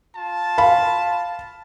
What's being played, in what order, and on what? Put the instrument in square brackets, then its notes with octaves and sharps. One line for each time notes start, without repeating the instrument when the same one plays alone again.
[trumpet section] F4 A5
[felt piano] F5 B5